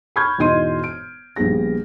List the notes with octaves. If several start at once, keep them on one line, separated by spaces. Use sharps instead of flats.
B5 C#6 F6 G6 G#6
E1 G#2 E3 D#5 C6 D#7
D7
A#1 G3 B3 G#4 A#6